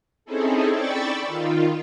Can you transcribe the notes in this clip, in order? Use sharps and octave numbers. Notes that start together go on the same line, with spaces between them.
C4 C#4 D#4 E4 G#4 A4
D5 G5 B5 C#6 E6 A6
D#3 F4